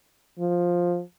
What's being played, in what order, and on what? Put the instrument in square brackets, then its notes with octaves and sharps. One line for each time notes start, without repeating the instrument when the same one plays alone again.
[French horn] F3